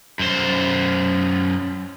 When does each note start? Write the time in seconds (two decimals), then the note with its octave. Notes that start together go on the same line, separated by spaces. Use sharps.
0.19 F#2 C5